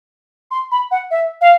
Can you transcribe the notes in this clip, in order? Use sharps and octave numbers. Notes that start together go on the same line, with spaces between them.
C6
B5
F#5
E5
F5